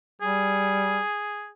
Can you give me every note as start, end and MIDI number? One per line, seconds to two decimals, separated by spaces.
0.22 1.02 55
0.22 1.49 68